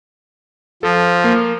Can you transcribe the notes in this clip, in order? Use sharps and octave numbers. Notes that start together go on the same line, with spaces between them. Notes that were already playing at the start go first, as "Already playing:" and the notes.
F3 A4
A#3